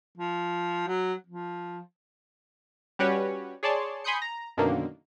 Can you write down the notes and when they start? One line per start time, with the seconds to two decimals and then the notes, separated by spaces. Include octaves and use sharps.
0.17 F3
0.87 F#3
1.27 F3
2.99 G3 C#4 F#4 G4 B4 C#5
3.63 G#4 C#5 D5 A5 C6
4.04 G#5 B5 C6 D#6 G6 C#7
4.22 A#5
4.57 F#2 B2 D3 D#3 A#3